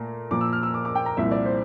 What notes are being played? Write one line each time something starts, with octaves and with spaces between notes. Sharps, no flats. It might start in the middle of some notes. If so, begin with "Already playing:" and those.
Already playing: A#2 A3 A#5
A#2 F3 A#3 D6
E6
F6
E6
D6
D6
G5
A#5
C2 A#2 F3 E5
D5
C5